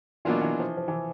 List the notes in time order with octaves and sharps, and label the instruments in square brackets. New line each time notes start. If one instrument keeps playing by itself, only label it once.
[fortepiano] B2 F#3 A#3 D4 F4 [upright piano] E3
[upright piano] E3
F3
F3
E3